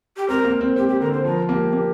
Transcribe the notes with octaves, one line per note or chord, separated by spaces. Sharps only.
G4
C4 A#4
A#3
C4
C4 G4
G4
D3 A#4
C5
F3 A#4
A#3 G4
A#3